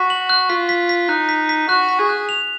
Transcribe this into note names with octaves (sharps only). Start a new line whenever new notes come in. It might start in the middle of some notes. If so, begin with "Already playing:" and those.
Already playing: F#4 B6
F#7
F#6
F4 B6
B6
B6
D#4 F#6
B6
B6
F#4 F#6
B6
G#4
F#6
F7